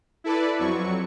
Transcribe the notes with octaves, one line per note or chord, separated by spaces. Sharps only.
E4 A4 B4 D5
F2 F#3 C#6